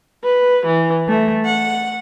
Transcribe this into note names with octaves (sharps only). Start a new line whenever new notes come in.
B4
E3
A3
F#5